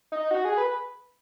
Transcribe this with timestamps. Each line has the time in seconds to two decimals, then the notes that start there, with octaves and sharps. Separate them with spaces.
0.12 D#4
0.31 F#4
0.45 G#4
0.58 B4